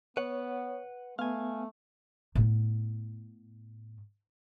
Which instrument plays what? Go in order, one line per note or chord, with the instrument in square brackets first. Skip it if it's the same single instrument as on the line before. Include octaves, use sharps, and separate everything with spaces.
[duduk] B3 [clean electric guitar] B4 F#5 [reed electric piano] C#5
[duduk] A3 [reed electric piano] B3 [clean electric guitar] F5 G#5
[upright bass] A2 B3